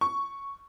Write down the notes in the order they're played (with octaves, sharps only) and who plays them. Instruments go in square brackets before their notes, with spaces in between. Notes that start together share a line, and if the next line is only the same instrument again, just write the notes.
[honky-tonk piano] C#6